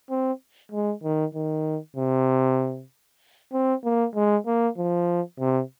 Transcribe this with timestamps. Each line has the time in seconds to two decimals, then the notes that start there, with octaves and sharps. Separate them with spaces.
0.10 C4
0.72 G#3
1.03 D#3
1.34 D#3
1.96 C3
3.53 C4
3.84 A#3
4.15 G#3
4.47 A#3
4.78 F3
5.40 C3